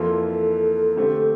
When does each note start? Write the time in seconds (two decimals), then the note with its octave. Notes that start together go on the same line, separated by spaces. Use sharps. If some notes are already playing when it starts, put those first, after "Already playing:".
Already playing: F2 E3 A#3 F4 A4
0.96 D3 A3 C4 G4